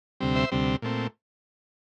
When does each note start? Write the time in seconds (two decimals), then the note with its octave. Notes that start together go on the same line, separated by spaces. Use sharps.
0.20 D2 C3 G3 C4
0.35 C5 E5
0.52 D2 C3 G3 C4
0.82 A#2 A3 C4